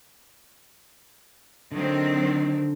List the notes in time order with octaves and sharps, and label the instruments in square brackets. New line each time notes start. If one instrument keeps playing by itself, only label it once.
[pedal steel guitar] D3 [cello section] D#3 F#3 C4